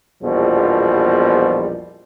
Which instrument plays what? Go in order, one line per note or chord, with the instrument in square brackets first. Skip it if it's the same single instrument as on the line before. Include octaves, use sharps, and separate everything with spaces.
[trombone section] A#1 E2 B2 F3 G3